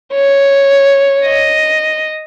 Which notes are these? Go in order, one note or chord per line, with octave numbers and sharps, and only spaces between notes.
C#5
D#5